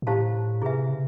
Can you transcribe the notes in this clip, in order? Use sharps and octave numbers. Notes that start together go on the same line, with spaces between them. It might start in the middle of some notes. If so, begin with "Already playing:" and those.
A#2
A2 E4 G4 C5 F5 A5
C3 E4 G#4 B4 E5 G#5
C#3